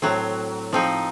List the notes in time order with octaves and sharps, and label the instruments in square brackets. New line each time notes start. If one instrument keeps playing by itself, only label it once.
[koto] A2 F#3 C4
F3 C4 D#4